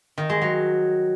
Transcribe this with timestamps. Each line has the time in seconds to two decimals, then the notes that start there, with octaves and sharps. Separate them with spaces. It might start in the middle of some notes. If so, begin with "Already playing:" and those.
0.18 D#3
0.30 G#3
0.42 F#3